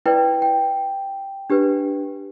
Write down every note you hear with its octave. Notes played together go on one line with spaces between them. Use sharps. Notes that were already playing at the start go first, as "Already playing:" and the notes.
E4 B4 D5 G5
G5
D4 G4 B4